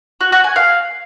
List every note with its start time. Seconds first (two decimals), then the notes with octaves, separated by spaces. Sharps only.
0.21 F#4
0.32 F#4
0.44 G#5
0.56 F5